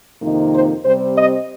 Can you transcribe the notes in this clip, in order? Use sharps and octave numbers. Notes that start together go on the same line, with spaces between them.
F2 C3 D#3 A#3 D#4
C5
C3 G3 C4 C5
D#5